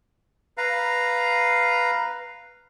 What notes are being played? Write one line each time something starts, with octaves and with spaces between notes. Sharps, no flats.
B4 F5 A#5